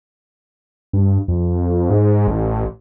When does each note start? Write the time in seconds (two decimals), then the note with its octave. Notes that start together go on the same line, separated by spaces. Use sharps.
0.93 G2
1.28 F2
1.90 G#2
2.27 A1